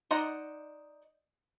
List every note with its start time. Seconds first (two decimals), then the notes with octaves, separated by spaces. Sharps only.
0.11 D#4 C5 D5 D#5 F#5